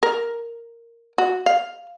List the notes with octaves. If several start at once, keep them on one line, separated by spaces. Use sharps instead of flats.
A#4
F#4
F5